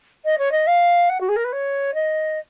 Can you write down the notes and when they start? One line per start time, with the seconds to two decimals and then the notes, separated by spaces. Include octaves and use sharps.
0.24 D#5
0.38 C#5
0.51 D#5
0.66 F5
1.09 F#5
1.20 F#4
1.28 G#4
1.36 A#4
1.44 B4
1.52 C#5
1.94 D#5